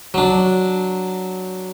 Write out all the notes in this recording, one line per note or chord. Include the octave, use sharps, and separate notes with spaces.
F#3 D4